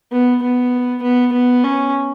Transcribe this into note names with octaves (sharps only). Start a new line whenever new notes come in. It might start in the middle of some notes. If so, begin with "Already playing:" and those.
B3
B3
B3
B3
C#4